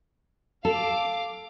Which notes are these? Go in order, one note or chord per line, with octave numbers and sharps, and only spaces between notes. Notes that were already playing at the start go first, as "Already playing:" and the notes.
A4 F5 D6